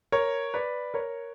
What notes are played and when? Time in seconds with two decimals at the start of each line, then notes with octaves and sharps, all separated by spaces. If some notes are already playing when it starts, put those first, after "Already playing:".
0.12 A#4 C#5
0.54 B4 D5
0.94 A#4 C#5